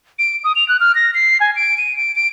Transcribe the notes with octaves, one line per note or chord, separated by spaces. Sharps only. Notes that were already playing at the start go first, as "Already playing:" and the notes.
D7
D#6
F7
F#6
F6
A#6
C7
G#5
D7
D#7
D7
D7